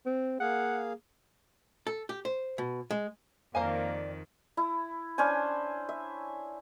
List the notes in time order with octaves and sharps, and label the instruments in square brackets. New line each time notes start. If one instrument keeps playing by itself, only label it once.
[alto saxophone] C4
[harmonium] A#3 G#4 F5 [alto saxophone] F#5
[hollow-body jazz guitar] A4
G4
C5
B2
G#3
[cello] F2 D#3 [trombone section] A#3 [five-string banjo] C5 F5 G#5 [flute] D5
[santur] E4
C#4 D4 C5 G#5
E5